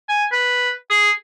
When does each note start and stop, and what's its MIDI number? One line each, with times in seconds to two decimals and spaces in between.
0.09 0.25 80
0.32 0.71 71
0.90 1.10 68